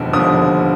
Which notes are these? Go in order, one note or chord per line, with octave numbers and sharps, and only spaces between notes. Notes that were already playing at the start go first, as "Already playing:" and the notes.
Already playing: E1 D#2 D3 F3
E1 D#2 D3 F3 D#6